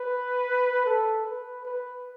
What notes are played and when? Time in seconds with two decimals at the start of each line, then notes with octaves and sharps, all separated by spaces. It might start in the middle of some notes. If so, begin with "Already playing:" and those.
Already playing: B4
0.86 A4
1.25 B4
1.65 B4